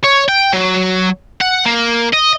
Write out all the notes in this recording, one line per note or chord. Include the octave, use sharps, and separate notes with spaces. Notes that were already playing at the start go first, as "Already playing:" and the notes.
C#5
G5
F#3
F#5
A#3
D#5